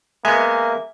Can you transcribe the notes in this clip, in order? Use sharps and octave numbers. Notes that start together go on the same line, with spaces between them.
G#3 A#3 B3 E5 G#5